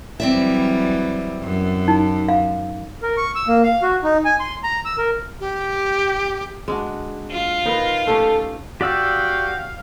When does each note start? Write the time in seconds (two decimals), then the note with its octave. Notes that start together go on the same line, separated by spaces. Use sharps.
0.20 E3 F#3 G3 C4 D5 E5
1.43 F#2
1.88 D#4
2.29 F5
3.03 A#4
3.17 C#6
3.35 E6
3.48 A#3
3.64 F5
3.82 F#4
4.03 D#4
4.25 G#5
4.40 C6
4.64 A#5
4.85 E6
4.98 A#4
5.41 G4
6.68 G#3 D4 F#4
7.31 F4
7.66 D#4 A#4 B4
8.07 A3 C#4 G4 A4
8.81 F#4 G4 D5 F5 G5 E6